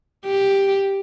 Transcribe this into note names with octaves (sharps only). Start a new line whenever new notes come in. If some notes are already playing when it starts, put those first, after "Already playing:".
G4